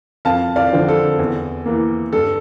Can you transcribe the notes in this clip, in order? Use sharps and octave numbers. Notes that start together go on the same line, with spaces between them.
F2 F5 A5
D5 F5
D3 F3 C4
A4
E2
E3 A#3
G2 A4